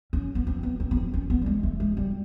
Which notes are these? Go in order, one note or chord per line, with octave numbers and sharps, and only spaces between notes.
C#4
B3
C4
B3
C4
B3
C4
C#4
B3
G3
G#3
A3
G#3
G3